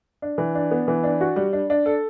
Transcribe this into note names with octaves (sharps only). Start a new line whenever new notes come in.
D4
E3
D4
B3
E3
D4
F#4
G3
D4
D4
A4